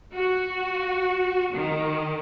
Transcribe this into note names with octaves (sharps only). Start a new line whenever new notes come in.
F#4
D#3